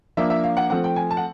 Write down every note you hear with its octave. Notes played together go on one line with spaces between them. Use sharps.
F3 A#3 D4 E5
E5
F5
F#5
F3 A3 C4 F#5
G5
G#5
A5
F#5